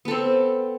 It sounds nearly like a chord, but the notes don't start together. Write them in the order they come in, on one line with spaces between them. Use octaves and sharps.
B3 A4 C4